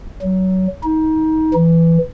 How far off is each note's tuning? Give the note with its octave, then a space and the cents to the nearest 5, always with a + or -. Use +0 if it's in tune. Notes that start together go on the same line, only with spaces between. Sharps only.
F#3 +20
D#4 +25
E3 +10